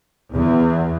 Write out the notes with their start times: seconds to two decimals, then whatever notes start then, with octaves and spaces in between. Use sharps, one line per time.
0.34 E2